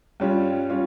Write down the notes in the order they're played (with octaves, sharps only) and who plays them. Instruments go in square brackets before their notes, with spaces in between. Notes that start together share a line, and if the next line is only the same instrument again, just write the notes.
[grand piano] G2 G3 C#4 F4
G3 C#4 F4